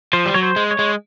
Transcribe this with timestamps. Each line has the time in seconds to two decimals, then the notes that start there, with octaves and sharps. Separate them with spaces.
0.13 F3 C5
0.26 G3
0.34 F#3 C#5
0.43 C5
0.56 G#3
0.71 C#5
0.79 G#3